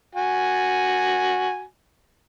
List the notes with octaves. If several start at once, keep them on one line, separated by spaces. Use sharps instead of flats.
F#4 G#5